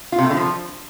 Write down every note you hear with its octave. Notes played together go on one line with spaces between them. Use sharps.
F4
C3
A3
D3
F3